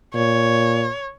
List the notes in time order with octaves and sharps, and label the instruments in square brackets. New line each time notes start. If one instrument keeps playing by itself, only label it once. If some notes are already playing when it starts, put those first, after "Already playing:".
[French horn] A#2 [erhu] C#5